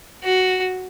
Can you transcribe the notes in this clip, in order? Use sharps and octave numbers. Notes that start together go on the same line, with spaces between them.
F#4